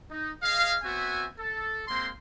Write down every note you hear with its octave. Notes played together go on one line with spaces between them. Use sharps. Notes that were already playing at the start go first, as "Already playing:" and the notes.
D#4
G#4 D#5 F5
B3 C4 F#4 E5 G#5
A4
G#3 A#3 C4 C6